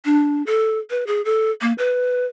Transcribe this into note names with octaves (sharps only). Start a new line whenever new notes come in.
D4
A4
B4
G#4
A4
A#3
B4